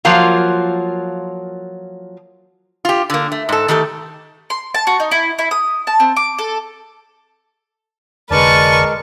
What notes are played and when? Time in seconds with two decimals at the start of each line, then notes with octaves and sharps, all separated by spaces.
0.05 F3 F#3 A#3 F4
2.85 F4 G4
3.10 D3 A#3
3.32 A3
3.49 G#2 A4
3.68 D#3 A3 G4 A4
4.50 C6
4.74 A5
4.87 F#4
5.00 D#4
5.12 E4
5.39 E4
5.51 D#6
5.87 A5
6.00 C4
6.17 D6
6.39 A4
8.31 F1 D3 G#3 A#4 B4 D5 A5 C#6